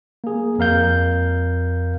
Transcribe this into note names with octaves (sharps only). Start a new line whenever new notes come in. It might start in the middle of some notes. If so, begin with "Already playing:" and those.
A#3 G#4
F2 A#4 F5 G6